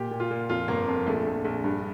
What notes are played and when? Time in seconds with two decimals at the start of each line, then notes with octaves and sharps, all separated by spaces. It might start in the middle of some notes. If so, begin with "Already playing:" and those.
Already playing: A#2 G4
0.11 A#2
0.20 F4
0.31 A#2
0.49 F2 F4
0.68 G1 A#3
0.88 F2
1.07 A#1 A3
1.26 A#1
1.45 A#1
1.64 G2